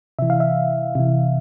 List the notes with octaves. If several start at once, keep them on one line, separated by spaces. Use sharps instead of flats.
C3 E3 E5
F5
E5
C3 E3